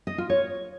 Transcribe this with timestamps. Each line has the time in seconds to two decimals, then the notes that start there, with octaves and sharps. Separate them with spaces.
0.07 D#5
0.18 F4
0.30 C#5